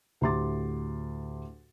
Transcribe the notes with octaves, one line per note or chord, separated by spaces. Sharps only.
D2 A2 G4 C6 D6 A6